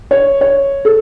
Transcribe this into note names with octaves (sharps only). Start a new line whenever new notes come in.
C#5
C#5
A4